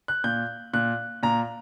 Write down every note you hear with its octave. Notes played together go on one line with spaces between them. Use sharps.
F#6
A#2 G6
A#2 F#6
A#2 A#5